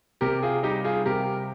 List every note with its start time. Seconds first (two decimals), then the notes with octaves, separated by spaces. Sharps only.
0.21 C3 G4 A#4
0.43 F4 G#4
0.63 G3 D#4 G4
0.84 F4 G#4
1.06 C3 G4 A#4